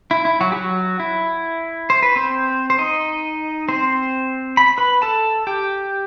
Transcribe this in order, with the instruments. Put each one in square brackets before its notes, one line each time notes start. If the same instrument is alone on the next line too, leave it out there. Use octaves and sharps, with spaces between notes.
[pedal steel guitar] E4
E4
F#3 F#4
G4
F#3 F#4
E4
C5
B4
C4 C5
C5
D#4 D#5
C4 C5
B5
B4 B5
A4 A5
G4 G5